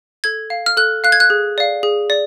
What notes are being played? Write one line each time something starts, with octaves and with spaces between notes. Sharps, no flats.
A4 G#6
F5
F6
A4 F#6
F5 F#6
G#6
F#6
G#4
D5 F5
G#4
D5